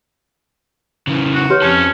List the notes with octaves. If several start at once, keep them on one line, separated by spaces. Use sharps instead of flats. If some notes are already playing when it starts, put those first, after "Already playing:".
C#3 E3
F#4
G4 B4 C#5
F2 C#4 A4